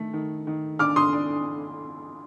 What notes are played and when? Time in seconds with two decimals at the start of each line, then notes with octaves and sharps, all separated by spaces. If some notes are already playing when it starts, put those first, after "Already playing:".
Already playing: D#3 A3
0.14 D#3
0.47 D#3
0.79 D4 D6 F6
0.96 C6 D#6
1.13 D4